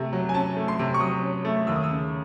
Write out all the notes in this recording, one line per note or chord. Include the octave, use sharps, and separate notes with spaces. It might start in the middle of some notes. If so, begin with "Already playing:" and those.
Already playing: C3 A3
F#3
G#5
C#4 A5
A3
C6
C3
C#6
F#3 D#6
C#4
A3
D#2 E6
D#6
E6
C#3